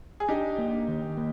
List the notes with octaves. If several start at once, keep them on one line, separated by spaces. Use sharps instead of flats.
G#4
D4 D#4 G4
A#3
D#3
A#3